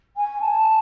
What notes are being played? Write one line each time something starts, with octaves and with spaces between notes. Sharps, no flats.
G#5
A5